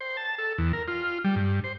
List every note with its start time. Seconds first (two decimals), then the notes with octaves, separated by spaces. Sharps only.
0.01 C5
0.17 A5
0.38 A4
0.58 E2
0.73 A#4
0.88 F4
1.24 G3
1.36 G2
1.64 C5